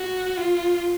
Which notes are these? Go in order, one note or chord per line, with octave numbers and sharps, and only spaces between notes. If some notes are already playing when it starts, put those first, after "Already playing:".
Already playing: F#4
F4